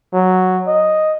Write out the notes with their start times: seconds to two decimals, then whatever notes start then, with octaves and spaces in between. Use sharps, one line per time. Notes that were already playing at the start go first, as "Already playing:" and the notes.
0.14 F#3
0.68 D#5